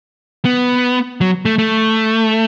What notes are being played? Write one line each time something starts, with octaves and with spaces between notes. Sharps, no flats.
B3
F#3
A3
A3